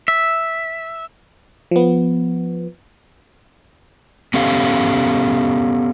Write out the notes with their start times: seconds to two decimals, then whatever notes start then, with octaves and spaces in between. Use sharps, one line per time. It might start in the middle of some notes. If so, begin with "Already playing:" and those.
0.08 E5
1.71 F3 B3
4.34 B3 C#4 G4 A4 F5